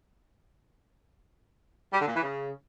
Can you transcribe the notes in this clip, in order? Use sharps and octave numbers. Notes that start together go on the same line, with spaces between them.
G3
D3
A#2
E3
C#3